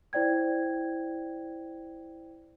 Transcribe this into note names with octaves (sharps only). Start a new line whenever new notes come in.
E4 C5 D5 G5 G#6